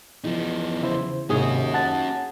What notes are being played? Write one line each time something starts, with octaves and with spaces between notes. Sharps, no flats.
E2 F3 D#4
C#3 E4 C5
D#2 G#2 C3 C#4 F#4 G#4
F#5 A5 A6